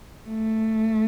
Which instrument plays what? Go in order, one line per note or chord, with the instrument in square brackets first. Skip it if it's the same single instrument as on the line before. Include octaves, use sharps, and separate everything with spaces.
[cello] A3